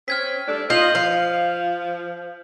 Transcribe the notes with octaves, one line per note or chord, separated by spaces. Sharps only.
C4 C#4 F6 G#6 B6
G3 A3 D4
F4 D#5 G6 F7 F#7
F3 F5